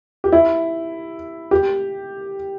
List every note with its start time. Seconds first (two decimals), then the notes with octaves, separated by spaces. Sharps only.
0.24 G4
0.32 E4
1.51 G4